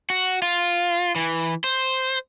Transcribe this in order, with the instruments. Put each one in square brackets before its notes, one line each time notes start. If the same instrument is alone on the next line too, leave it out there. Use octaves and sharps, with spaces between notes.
[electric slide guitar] F#4
F4
E3
C5